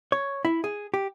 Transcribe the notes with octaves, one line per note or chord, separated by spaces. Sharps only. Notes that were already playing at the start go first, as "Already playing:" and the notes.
C#5
E4
G#4
G4